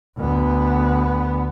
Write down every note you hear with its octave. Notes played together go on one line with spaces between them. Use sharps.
D2 B3